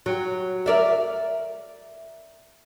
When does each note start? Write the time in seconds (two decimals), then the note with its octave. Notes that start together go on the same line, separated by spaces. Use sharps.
0.06 F#3
0.66 A#4 D5 E5